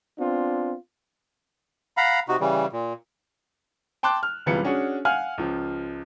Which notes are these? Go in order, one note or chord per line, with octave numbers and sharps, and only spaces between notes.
B3 C4 D4 F4
F5 F#5 A#5 B5
C3 D#4 F#4
C#3 E3 G3
A#2
G5 A5 C6 D6 F#6
F6
F#1 C3 E3 G3 F4 C#7
C#4 D4 F#4 G#4
F5 F#5 G#5 F6
C#2 F3